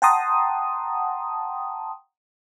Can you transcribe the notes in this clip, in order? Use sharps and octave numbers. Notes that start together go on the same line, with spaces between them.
F#5 G5 A5 A#5 C6 D#6